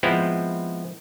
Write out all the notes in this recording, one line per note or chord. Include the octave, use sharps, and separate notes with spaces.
F3 G#3 B3 C4 E4